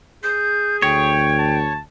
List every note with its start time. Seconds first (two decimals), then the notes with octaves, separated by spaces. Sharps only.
0.23 G#4 G6
0.82 D2 C#5 G5
1.39 A5